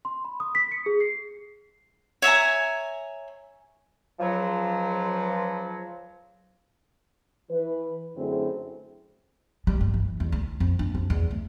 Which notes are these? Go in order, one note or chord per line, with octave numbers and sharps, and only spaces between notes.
C6
B5
D#6
B6
C#7
G#4
C7
C#5 E5 G#5 A#5
C#2 F3 F#3
E3 B4
F#2 D3 A3 C4 E4 G#4
G3
G2
E3
E2
D2
F2
D4
F2
E2
A3